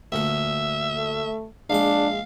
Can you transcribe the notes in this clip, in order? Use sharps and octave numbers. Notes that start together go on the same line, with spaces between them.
D2 A#2 A4 E5
A3
A#1 G#3 D4 F5 D6